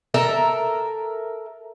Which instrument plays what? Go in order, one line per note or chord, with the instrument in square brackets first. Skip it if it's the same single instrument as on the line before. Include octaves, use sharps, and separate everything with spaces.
[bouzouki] A4 A#4 E5